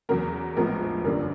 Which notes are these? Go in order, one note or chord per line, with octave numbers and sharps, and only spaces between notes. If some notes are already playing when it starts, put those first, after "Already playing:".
E2 C#3 F#3 A#3 A#4
A#1 A2 F3 G#3 B3 A#4
G1 F#2 D3 G3 A#3 A#4